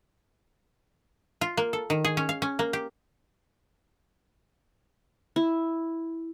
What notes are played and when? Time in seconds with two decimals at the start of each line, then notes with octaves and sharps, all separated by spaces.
1.41 F4
1.57 A#3
1.73 A4
1.90 D#3
2.05 G#4
2.17 C#4
2.29 F5
2.42 C#4
2.59 A#3
2.73 G4
5.36 E4